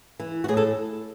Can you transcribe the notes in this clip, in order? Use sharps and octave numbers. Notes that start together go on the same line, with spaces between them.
E3
F#4
A2 G#4
A4